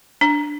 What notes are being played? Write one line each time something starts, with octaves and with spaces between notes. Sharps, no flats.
D4